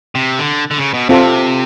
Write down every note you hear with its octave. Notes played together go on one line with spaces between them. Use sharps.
C3
D3
D3
C#3
B2
C3 C4 F4 A4